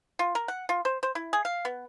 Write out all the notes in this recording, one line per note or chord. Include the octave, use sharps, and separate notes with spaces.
F4
A#4
F#5
F4
C5
C5
E4
G#4
F5
B3